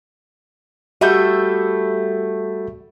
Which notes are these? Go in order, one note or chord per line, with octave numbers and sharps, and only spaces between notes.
G3 A3 F#4 E5 G6